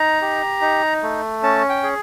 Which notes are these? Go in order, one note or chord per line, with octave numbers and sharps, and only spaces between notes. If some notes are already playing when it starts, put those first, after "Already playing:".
Already playing: D#4 A#5
G4
D#4
A3
C#4 A5
G5
G#4